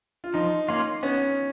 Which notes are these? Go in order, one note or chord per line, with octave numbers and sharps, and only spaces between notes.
F4
F3 D#4
A#3 C#4 F4
B3 C#4